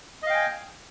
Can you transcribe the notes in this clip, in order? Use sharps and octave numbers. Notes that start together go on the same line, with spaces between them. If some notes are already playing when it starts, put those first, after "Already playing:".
D#5 F5 G5 G#5